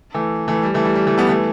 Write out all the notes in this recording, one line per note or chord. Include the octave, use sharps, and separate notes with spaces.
E3 A3
E3 A3
G3
E3 A3
G3
G3
E3 A3
G3 B3
E3 A3